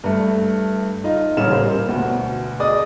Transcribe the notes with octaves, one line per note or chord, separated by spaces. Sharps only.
G2 A3
D#4 F4
D#1 A1 C#3 C#5 F6 E7
G3 A#3 C5
D2 B2
G#4 D5 D#5 D#6